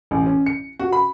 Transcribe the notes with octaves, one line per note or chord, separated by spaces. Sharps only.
A1
C#4
C#7
F#4
B5